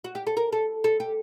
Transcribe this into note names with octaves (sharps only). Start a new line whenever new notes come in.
F#4
G4
A4
A#4
A4
A4
G4